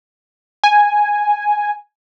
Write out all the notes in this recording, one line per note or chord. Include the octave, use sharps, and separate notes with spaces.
G#5